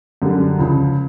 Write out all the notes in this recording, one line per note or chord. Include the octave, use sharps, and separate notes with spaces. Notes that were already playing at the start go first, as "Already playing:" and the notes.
F#2 D3 G3
C#2 C#3 F3